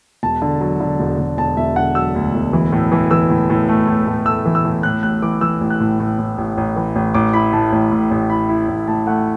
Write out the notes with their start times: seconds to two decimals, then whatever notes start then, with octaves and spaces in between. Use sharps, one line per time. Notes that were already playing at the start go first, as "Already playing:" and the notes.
0.23 E1 A5
0.42 D3
0.61 F#3
0.80 D3
1.00 E1
1.19 E1
1.38 E1 A5
1.57 E1 E5
1.76 D3 F#5
1.95 F#3 E6
2.15 D2
2.34 E1
2.53 E3
2.72 A2
2.92 E3
3.11 E3 E6
3.30 A2
3.50 A2
3.69 A3
3.88 A2
4.07 A2
4.26 A3 E6
4.46 E3
4.55 E6
4.65 A2
4.83 A2 F#6
5.03 A1 F#6
5.22 E3 D6
5.41 E3 E6
5.61 A1
5.70 F#6
5.80 A2
6.00 A2
6.18 A2
6.38 A1
6.57 A1
6.76 E3
6.96 A1
7.14 A1 D6
7.33 E4 B5
7.53 A2 A5
7.72 A1
7.91 A2
8.11 A1
8.30 E4 B5
8.49 E4
8.68 A1
8.88 A2 A5
9.07 A3 F#5